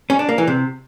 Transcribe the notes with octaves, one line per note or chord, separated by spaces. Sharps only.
C#4
D4
A#3
E3
C3